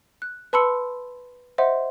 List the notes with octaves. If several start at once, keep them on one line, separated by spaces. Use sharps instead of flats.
F#6
B4 A5 B5 C6 E6 C#7
C5 D#5 E5 F#5 C6